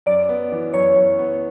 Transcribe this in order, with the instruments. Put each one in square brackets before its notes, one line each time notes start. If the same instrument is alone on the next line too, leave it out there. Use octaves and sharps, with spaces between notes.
[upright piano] F#2 [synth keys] D5
[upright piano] B3
E3
[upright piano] F#2 [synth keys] C#5
[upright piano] F#2
B3